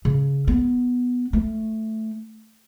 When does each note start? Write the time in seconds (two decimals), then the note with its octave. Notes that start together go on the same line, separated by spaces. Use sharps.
0.05 C#3
0.48 B3
1.33 A3